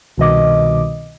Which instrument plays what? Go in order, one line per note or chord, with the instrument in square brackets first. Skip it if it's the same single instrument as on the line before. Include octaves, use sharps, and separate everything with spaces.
[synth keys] C2 B2 D#3 D#5 D6